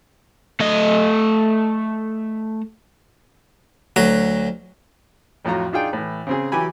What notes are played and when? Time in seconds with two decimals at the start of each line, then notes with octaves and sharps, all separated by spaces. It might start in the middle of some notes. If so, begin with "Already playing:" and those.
0.60 A3 D#5
3.96 D2 F#3 A#5
5.45 F2 A2 F#3 F4 A#5
5.73 D4 D#4 F4 G#4 G5
5.93 A2 E3
6.27 C#3 C4 G#4
6.52 E3 F#3 G4 G#5 B5